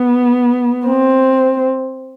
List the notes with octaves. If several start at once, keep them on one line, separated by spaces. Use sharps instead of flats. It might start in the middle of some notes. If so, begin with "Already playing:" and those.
Already playing: B3
C4